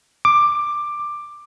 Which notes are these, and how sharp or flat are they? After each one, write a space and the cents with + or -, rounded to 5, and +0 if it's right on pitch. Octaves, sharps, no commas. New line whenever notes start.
D6 +10